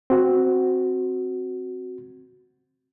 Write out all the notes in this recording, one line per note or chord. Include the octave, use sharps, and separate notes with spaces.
C4 F#4